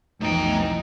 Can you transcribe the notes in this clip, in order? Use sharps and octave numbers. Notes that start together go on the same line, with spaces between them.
F1 B1 E3 A3 D#4 G5